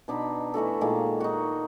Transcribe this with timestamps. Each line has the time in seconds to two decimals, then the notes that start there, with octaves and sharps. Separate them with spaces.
0.08 B2 D4 D#4 B5
0.54 E3 A3 F#4 A4
0.81 A#2 D#3 G#3 A#3
1.20 D#4 F#4